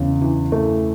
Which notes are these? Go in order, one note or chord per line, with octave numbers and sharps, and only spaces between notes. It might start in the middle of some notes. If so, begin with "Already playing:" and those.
Already playing: E2 C#3
E3
A3